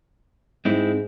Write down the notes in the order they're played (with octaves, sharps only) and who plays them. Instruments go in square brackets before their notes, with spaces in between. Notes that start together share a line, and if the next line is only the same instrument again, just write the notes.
[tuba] G#2 [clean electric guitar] G#3 C4 E4